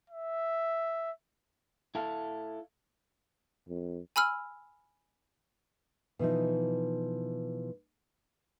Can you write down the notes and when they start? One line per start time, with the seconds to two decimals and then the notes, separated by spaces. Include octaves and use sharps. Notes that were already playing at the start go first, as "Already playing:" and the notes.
0.10 E5
1.95 E4 A4 F5
3.68 F2
4.16 G#5 B5 E6 F6
6.19 B2 E3 F3 D#4